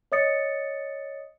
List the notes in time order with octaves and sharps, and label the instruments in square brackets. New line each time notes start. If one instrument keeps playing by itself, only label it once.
[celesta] C#5 D#5 D#6 A6 C#7